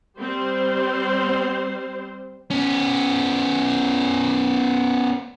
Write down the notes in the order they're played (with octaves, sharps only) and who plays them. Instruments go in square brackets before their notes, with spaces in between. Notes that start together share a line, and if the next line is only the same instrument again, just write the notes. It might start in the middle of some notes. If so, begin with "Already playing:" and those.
[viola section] G3 C4 C5
[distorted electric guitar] B3 C#4